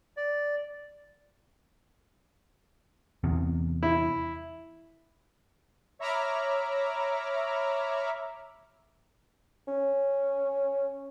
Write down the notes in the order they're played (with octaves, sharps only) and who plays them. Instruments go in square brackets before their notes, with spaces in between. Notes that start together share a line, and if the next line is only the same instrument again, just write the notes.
[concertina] D5
[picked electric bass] E2 C3
[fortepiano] E4
[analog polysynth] C#5 E5 A#5 B5 D6 F6
[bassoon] C#4